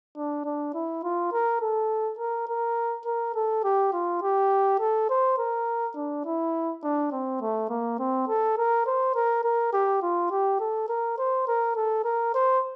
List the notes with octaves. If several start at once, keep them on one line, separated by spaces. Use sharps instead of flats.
D4
D4
E4
F4
A#4
A4
A#4
A#4
A#4
A4
G4
F4
G4
A4
C5
A#4
D4
E4
D4
C4
A3
A#3
C4
A4
A#4
C5
A#4
A#4
G4
F4
G4
A4
A#4
C5
A#4
A4
A#4
C5